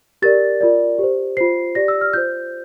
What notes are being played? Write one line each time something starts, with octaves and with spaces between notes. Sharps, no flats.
G4 A#4 D5 A6
F4 A#4 D5
G4 C5
F4 C5 C7
G4 D5 A#6
E6
F6
F4 C5 G6